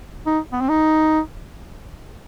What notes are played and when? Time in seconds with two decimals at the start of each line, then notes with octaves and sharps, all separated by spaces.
0.26 D#4
0.52 B3
0.61 C4
0.69 D#4